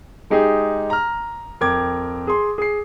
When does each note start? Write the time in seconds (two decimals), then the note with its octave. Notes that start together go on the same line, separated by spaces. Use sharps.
0.30 G#3 D#4 G4 G#4
0.90 A#5 F6
1.61 F2 A#4 G5 D6 G#6
2.27 G#4 C6
2.58 G#4 C7